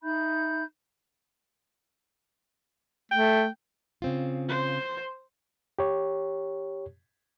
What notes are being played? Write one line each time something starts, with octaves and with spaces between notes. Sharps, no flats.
D#4 E5 B5 G6
A3 G5
C#3 C4 F4
C5
G4 C#5